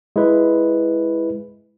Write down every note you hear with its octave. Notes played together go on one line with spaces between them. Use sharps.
G#3 E4 B4